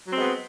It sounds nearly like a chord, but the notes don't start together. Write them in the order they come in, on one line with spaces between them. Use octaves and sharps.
F#3 C4 G#3 B3